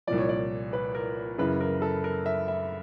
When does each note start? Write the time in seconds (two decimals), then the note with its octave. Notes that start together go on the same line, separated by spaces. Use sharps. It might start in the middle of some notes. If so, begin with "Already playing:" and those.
0.07 C2 A#2 F3 D5
0.18 C#5
0.29 D5
0.73 B4
0.95 A#4
1.38 F#2 C#3 E3 B4
1.61 A#4
1.82 A4
2.04 A#4
2.26 E5
2.48 E5